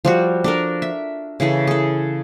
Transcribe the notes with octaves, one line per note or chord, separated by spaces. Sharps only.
F3 G3 F#4
D4 A4 A#4
E5
C#3 E3 G#4 A4
G#4 A4